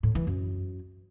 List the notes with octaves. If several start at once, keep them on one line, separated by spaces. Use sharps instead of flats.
A2
E3
F#2